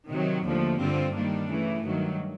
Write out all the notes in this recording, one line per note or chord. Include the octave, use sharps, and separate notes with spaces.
C3 D#3 F#3
D#2 D3 F3 A3
G2 D3 G3 C4 F4
D#3 G3 A#3 D4
C#3 E3 A3
G2 D#3 F#3